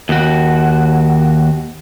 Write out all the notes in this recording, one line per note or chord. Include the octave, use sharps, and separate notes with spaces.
D#2 F#4